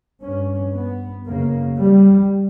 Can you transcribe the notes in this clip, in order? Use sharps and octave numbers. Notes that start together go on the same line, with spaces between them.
G2 C#4
B3
F#2 C#3 A#3
G3